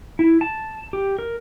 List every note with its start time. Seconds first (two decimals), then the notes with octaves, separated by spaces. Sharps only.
0.19 E4
0.41 A5
0.93 G4
1.19 A#4